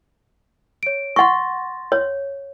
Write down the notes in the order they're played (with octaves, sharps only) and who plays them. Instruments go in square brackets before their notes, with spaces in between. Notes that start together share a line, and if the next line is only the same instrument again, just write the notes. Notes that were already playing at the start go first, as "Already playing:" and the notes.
[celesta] C#5 D7
[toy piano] F#5 C#6 [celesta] C6 A6 A#6
[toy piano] C#5